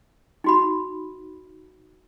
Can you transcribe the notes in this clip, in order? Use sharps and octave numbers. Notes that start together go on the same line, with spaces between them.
D#4 F#4 B5